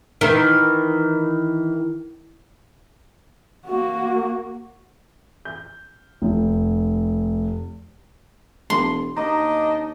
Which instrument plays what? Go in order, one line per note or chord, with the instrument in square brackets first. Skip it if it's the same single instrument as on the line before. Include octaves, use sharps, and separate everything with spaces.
[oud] D#3 E3
[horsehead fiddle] A#3 F#4
[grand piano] G6
F1
[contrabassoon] E1 [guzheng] C6
[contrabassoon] D#2 [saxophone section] D4 D#4 D#5 [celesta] A#5